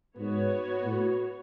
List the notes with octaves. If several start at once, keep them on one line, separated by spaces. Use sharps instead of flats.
G#2 B3 F#4 C#5
A2